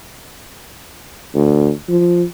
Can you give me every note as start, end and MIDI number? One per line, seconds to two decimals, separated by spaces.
1.34 1.70 38
1.89 2.23 53